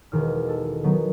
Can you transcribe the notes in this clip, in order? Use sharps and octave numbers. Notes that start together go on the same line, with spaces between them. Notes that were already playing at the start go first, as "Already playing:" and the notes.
E1 D#3 F6
A4
D#3 F#3 B3